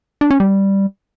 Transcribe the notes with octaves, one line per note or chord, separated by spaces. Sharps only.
D4
C#4
G3